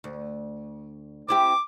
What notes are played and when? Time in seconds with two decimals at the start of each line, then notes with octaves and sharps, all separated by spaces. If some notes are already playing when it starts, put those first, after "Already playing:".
0.04 D2
1.29 C4 E4 G4 D6